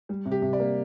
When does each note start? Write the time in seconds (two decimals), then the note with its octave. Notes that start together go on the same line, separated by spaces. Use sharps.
0.09 G3
0.25 C3
0.31 G4
0.42 C3
0.53 D5
0.59 A#3